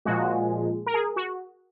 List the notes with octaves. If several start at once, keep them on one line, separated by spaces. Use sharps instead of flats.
A#2 F3 G#3 F#4
A#4
G#4
F#4